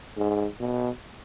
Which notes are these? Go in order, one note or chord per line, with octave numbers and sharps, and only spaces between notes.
G#2
B2